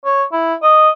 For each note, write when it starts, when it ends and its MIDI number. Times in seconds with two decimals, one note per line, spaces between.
0.05 0.23 73
0.33 0.54 64
0.63 0.89 75